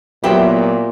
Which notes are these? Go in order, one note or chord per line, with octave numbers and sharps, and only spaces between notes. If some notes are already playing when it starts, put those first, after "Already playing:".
A#2 F#3 B3 E4 G4 C5 G5